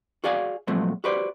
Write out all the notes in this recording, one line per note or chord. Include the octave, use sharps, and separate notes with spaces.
F#4 G#4 D5 F5 G#5
A#2 F3 F#3 G#3 A3 C4
F#4 G4 B4 C5 D5